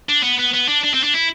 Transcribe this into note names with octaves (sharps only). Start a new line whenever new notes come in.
D4
B3
B3
B3
D4
D4
C4
D4
E4